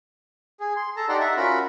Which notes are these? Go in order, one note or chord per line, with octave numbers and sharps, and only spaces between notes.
G#4
C6
A4 A5 A#5
D#4 G4 D5 F#5 A#5 C6
E5 F#5 A#5
C#4 F4 F#4 A#4 B5